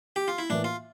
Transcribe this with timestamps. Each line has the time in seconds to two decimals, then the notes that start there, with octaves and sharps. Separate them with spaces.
0.16 G4
0.28 F4
0.38 E4
0.50 A2 E3 A#3 D4
0.64 F4